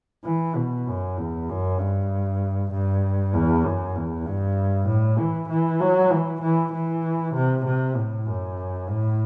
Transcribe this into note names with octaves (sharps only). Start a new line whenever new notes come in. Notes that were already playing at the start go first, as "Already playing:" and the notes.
E3
B2
F#2
E2
F#2
G2
G2
E2
F#2
E2
G2
A2
E3
E3
F#3
E3
E3
E3
C3
C3
A2
F#2
A2